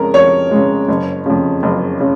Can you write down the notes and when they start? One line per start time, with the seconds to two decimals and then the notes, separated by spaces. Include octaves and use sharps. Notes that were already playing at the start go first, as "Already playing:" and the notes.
Already playing: F2 C#3 G#3 A#4
0.14 F2 C#5
0.51 C#3 G#3
0.88 F#1
1.26 F2 C#3
1.63 F#1
2.00 C#3